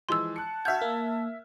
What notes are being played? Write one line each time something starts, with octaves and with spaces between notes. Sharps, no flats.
E3 F3 G#3 C6 E6
A5 F#6 C#7
F#4 E5 F#5 F6 G6 G#6
A#3